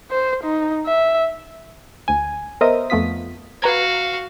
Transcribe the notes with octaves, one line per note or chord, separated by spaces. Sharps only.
C5
D#4
E5
D2 G#5
B3 A#4 C5 D#5 E5 D#6
F2 A3 B3 F4 D#6 B6
F#4 B4 F5 A#5 G#6